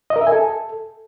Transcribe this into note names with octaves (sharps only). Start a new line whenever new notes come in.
D#5
A#4
E5
G#5
A4